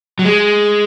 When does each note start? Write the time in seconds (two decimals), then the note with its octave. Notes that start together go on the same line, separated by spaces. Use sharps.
0.19 F#3
0.25 G#3